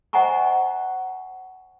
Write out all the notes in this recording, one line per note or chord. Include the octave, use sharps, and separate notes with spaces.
C5 D#5 F#5 G#5 A#5 C#6